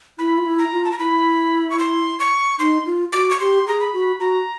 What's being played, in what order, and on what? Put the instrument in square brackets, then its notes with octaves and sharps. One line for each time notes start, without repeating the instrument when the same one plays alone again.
[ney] E4 [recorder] B5
[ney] F4
E4
[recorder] A#5
[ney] F4
[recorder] A5
A#5
[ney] E4 [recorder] B5
[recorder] C#6
C6
C#6
[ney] D#4 [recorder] C6
[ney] F4
[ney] F#4 [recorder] D6
[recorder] C#6
[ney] G4 [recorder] C6
[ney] G#4 [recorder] A#5
[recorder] B5
[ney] F#4
[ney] F#4 [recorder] A#5